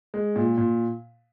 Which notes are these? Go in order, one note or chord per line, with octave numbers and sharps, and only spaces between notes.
G#3
A#2
A#2